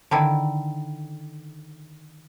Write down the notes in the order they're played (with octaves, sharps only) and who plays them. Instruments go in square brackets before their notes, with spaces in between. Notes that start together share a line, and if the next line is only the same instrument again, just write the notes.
[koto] D3 D#3 E4